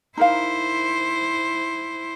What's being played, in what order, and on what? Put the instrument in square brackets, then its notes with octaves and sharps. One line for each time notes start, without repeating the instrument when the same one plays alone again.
[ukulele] D#4 A#4 F5 [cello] E4 C5